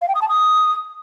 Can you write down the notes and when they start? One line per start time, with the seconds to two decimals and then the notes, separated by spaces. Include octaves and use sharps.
0.02 F5
0.08 G5
0.15 D#6
0.22 A5
0.28 D#6